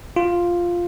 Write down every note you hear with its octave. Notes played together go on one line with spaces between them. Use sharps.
F4